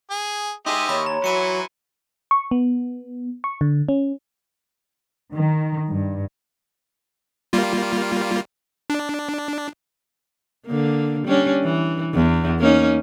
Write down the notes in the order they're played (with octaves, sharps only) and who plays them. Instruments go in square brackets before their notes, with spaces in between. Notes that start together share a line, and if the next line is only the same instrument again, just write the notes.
[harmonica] G#4
[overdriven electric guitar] D#4 G#4 [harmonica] G4 D#5 E5 [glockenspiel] C6
[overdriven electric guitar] D#2 [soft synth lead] C#5 [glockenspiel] B5
[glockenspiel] A#5
[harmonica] E3 E4 [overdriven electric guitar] F#3 [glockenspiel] C#7 D#7
[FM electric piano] C#6
B3
C#6
D3
C#4
[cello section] D#3
G2
[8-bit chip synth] G3 A#3 F4
D4
[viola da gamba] D3 A#3
G3 C#4 D4
E3
E2
A#3 C#4 D#4